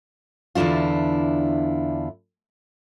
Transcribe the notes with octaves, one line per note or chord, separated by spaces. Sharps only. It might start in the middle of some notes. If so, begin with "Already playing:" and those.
E2 D3 D4 E4 F4